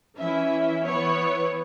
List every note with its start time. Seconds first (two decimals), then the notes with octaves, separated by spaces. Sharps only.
0.18 E3 C#4 E4 E5
0.84 E3 B3 E4 C#5